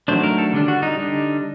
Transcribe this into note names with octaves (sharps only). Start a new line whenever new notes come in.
D#3 F#3 A3 D4 C5
A#4
A4
D3 G3 D4
F#4
D#4
D3 G3 D4